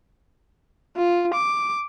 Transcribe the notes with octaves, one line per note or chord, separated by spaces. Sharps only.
F4
D6